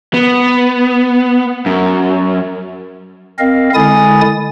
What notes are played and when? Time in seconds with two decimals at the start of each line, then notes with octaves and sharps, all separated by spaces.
0.14 B3
1.66 F#2
3.39 C4 A#4 D#5 F5
3.75 D3 G#3 E4 G#5 D#6 A6